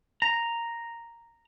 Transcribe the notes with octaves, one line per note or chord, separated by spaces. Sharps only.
A#5